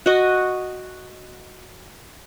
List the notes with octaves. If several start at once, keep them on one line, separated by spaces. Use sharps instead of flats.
F#4 D#5